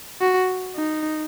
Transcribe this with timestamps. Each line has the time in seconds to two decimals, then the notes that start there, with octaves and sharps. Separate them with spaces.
0.21 F#4
0.76 D#4